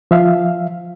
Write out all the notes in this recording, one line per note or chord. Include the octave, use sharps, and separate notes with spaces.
F3 E5 F5